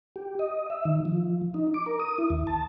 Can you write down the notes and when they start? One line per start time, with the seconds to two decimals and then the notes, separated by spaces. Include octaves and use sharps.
0.16 G4
0.39 D#5
0.70 E5
0.85 D#3
1.05 F3
1.54 D#4
1.74 D6
1.86 A#4
2.00 D#6
2.18 E4
2.30 D#2
2.47 A5